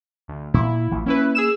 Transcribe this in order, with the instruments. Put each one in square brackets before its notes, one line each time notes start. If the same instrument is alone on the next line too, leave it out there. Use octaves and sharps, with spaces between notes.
[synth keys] D2
[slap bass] A#2 [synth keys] E4
[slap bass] A1 F3
[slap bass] A#3 [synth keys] C#4 E4 B4
[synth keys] G#4 E6 E7